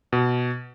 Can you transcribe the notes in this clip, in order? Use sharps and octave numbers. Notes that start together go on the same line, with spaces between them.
B2